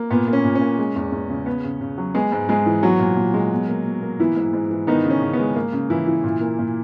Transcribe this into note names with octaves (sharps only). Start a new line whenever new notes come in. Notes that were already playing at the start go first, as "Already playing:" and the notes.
Already playing: A#3
A#2 B3
A#3
C#4
A#2
C#4
A#3
G#3
E2
E2
C#3
B3
C#3
C#3
F#3
G#3 B3 G#4
G#2
G#2 G#3 G#4
E3
F#3 B3 F#4
A#2
A#2
G#3
B2
A#3
B2
A#3
E3 B3 E4
G#2
G#2
E3
D#3 B3 D#4
C#3
C#4
C#3
B3
G#3
A#3
C#3
C#3 E3 E4
E3
A#2
A#3
A#2